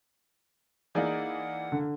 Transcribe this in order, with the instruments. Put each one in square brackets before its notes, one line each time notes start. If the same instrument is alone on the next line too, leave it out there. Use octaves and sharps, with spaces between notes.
[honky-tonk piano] E3 A#3 [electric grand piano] D#4 G#4 D5 [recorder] F#5
[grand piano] D3